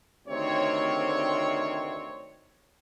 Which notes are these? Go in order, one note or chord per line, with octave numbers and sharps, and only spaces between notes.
D2 C3 D#3 C4 C#5